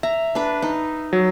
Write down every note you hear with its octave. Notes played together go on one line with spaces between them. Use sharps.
E5 A#5
D4 B4
D#4
F#3